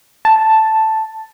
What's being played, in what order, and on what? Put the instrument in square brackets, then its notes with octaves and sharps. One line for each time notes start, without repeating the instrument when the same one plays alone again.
[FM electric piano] A5